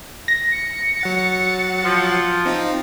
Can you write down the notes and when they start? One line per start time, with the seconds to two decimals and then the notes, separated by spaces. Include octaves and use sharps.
0.28 A#6
0.52 C#7
1.01 F#3 F#5 A6
1.85 F3
2.45 C4 D#4 F4